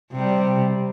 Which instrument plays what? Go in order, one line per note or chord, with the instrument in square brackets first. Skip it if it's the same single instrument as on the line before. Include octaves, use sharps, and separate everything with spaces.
[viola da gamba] C3 G3